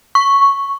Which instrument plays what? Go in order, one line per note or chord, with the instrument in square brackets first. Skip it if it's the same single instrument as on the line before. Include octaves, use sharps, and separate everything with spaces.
[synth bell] C#6